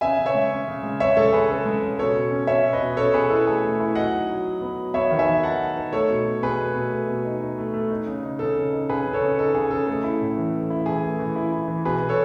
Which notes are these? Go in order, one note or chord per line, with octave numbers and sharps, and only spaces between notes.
C#3 E5 G#5
C#3
C#5 E5
G#3
C#4
C#3
G#3
C#3 C#5 E5
G#3 A4 C#5
C#5
C#3 G#4 B4
C#4 A4
G#3
C#3
B2 A4 C#5
B2
C#4
C#4 C#5 E5
B2
B4 D#5
B2
C#4 A4 C#5
B2 G#4 B4
E4 A4
A3 G#4
A3
E4
F#3 D#5 F#5
D#4
F#3
F#3
B3
F#3
B3 C#5 E5
D#3
E5 G#5
D#3
D#4 F#5 A5
D#4
D#4
A3 A4 C#5
B2
B2
B2 G#4 B4
A3
B2
A3
B2
D#4
D#4
A3
A3
D#4
C#3
D#4
C#3 A4
C#3
D#4
C#3 G#4 B4
C#3
A4 C#5
C#3
D#4 A4
C#3 G#4
C#3 A4
A3 A4
E4
A2
E3
A3
E4
E3 G#4
A3
E3
E4
E4
E3
B2 G#4 B4
B2
A4 C#5